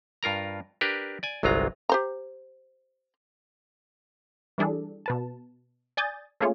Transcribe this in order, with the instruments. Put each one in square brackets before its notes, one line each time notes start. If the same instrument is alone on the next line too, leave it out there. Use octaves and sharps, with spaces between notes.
[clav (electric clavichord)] G2 F4 A#4 A#5
D4 G4 A#4 B4
D5 G#5
G1 C2 F#3 G#3 F4 A#5
[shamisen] G4 C5 A#5
[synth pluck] E3 G3 D4 G#4 A4
B2 B4 A5
D5 G#5 D#6 G6 A6
A3 A#3 C#4 F4 G#4 C#5